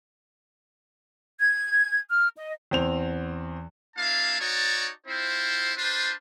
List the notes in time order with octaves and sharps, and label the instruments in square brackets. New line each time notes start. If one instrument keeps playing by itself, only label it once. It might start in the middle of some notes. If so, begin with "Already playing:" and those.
[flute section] G#6
F6
D#5
[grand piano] E2 C4 F7
[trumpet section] A#3 D4 E4 F5 A5
D#4 F#4 C#5 D5 A5
C4 E4 F4 C5
D4 F4 B4 C5